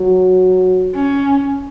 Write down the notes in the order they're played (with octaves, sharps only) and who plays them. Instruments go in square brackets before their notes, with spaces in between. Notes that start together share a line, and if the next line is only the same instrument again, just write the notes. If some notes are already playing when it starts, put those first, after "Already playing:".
Already playing: [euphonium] F#3
[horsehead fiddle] C#4